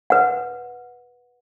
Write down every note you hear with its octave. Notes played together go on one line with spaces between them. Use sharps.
B4 F#5